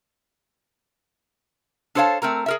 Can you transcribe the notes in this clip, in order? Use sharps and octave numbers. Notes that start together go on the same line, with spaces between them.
D4 A4 C5 C#5 F5 A5
A3 C4 A#4 A#5
G#4 A#4 E5